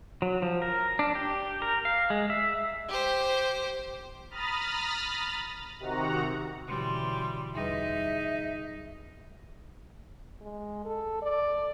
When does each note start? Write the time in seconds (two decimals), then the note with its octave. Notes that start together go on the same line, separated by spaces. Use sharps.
0.22 F#3
0.42 F3
0.62 A#4
0.99 D4
1.15 G4
1.62 A#4
1.85 F5
2.10 G#3
2.30 E5
2.89 G4 C5
4.30 A#5 B5 D#6 F6 A6
5.80 C3 D#3 F#4 F#5 A#5
6.68 B2 D3 E3 G3 C#4 F#4 C6
7.55 E2 G3 D#4 G#4 B4 E5
10.41 G#3
10.85 A4
11.22 D5